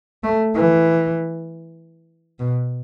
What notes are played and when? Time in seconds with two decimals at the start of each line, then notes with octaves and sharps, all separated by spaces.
0.24 A3
0.55 E3
2.39 B2